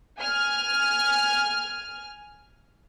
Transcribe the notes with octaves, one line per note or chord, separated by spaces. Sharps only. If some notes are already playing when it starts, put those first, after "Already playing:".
G#5 F6